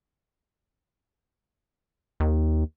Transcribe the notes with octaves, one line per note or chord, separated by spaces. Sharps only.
D#2